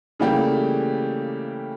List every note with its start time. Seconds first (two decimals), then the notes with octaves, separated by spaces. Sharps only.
0.19 C#3 E3 G3 A3 A#3 G4